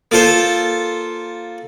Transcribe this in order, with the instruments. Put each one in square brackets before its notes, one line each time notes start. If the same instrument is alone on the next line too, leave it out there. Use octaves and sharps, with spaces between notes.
[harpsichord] A#3 F4 A4 C5